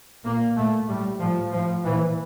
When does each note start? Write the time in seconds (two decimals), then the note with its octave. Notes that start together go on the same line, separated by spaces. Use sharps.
0.24 A#2 A#3
0.56 A#2 A3
0.88 A2 G3
1.20 A2 F3
1.52 A2 F3
1.84 A#2 E3